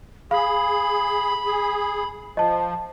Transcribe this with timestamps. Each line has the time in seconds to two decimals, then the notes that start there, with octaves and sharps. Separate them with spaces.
0.31 G#4 F5 B5
1.46 G#4
2.37 F3 D#5 A5